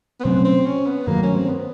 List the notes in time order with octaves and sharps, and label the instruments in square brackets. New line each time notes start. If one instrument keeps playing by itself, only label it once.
[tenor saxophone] B3
[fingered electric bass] B2 F#3 A3 C#4 [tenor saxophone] C4
[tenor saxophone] C4
C#4
B3
[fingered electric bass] G2 D#3 F#3 A3 [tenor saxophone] A#3
[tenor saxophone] C#4
C4
B3